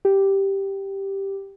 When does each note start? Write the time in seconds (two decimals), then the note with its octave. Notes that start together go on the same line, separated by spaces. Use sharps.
0.05 G4